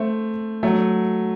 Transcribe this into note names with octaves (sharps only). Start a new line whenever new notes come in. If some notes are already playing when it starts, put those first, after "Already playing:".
Already playing: A3 C4
F#3 A3